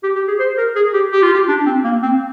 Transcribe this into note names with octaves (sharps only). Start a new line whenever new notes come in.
G4
G4
G#4
C5
A#4
G#4
G4
G4
F4
G4
D4
C4
A#3
C4